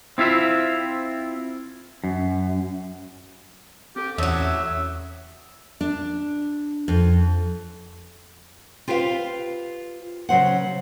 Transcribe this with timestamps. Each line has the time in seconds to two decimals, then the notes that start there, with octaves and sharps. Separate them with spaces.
0.18 C4 E4 F4 E5
2.04 F#2
3.96 C4 G4 A4 D6
4.18 E2 A2 F#3 C#4 C#5 E5 D#6
5.81 D4
6.88 F2
8.88 F4 G4 B4 C5 F5
10.29 C#3 F#3 C5 F#5